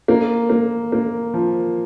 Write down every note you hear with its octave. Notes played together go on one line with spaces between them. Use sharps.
A#3
A#3
A#3
F3